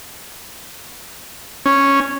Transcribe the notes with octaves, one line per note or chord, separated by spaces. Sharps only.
C#4